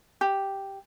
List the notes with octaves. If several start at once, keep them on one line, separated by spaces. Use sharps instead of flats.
G4